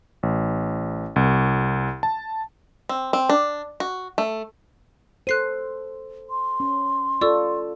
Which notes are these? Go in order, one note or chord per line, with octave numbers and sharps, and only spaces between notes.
A1
C2
A5
C4
C4
D4
F#4
A3
A4 C5 F#6 C7 D#7
C6
C#4
F4 A4 D5 C#6 E6